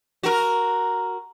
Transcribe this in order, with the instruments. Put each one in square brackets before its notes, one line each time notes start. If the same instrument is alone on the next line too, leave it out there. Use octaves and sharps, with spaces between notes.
[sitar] F#4 A#4